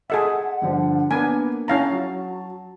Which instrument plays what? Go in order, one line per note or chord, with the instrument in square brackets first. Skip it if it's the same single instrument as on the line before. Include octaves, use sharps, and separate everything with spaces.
[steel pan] G#4 A4 E5 [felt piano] D#5 [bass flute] F#5
[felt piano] G2 D3 F3
[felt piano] A#3 B3 [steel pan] D4 G#5
[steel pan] C#4 F5 A#5 [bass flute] E4 [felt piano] A5
[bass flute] F#3